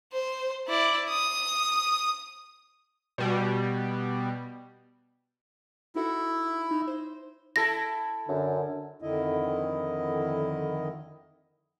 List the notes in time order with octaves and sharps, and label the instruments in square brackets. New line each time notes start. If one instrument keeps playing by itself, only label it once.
[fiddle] C5
E4 D5
D#6
[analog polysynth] B2 G3
[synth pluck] D#4 F#4 A4 [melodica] E4
[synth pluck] D#4
C5
[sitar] E4 A4 [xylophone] A#6
[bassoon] F#2 [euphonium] D3
[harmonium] F2 D3 D#3 E4 D#5